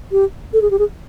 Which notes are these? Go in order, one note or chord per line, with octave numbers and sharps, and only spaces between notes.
G4
A4
G#4
G4
G#4